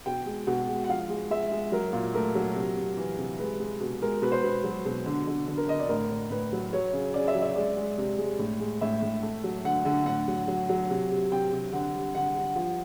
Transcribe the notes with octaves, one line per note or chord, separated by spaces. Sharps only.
B2 G5
G#3
B2 F#5
G#3
F#5
F3 F5
G#3
G#3 E5
G#3
F#3 A#4
A#2
A3 A#4
F#3
C3
C3
E3
C3
G#3 B4
G#3
B2
G#3 A#4
B2 B4
C5
B2 B4
F#3
B2
D3
D3
D3
A#4
D3 D#5
D5
A2 A#4
A2
A2 B4
F#3
F#3 C#5
C#3
C#3 D5
E5
F#3
E5
G#3 D5
G#3
C3
G#3
A2
G#3
A2 E5
A2
A3
F#3
D3 F#5
D3
A2 F#5
F#3
F#3
F#3
C3
C3
C3 G5
C3
D3 F#5
G3
D3 F#5
G3
F3